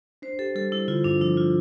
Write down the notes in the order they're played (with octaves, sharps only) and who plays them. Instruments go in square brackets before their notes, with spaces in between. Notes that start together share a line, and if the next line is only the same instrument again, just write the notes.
[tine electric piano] D4 [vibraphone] C5
[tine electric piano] G4 [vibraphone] A4
[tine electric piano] G3 [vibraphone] A4
[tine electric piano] G3 [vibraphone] E4
[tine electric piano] D3 [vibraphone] F4
[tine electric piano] G2 [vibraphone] D4
[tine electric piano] F3 [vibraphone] E4
[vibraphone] F4